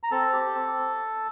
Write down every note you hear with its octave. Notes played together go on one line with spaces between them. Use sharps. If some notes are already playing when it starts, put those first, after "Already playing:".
A#5
C4 A4 A5
G4
C4